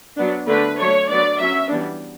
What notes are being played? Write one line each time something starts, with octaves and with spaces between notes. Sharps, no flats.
F#3 B3 D4
D3 A3 D4 B4
F#3 A3 D4 C#5
F#3 B3 D4 D5
F#3 C#4 E5
E3 G3 B3 D4